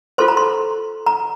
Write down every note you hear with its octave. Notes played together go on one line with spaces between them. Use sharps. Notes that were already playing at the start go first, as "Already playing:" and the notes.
F4 A4 C5 C6
A#5
C6
A#5